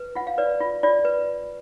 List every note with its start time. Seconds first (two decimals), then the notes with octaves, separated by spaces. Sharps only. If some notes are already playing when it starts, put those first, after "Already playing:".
Already playing: B4
0.15 F4 F#5
0.27 F5
0.38 B4 D5
0.60 F4
0.83 F4 D5
1.05 B4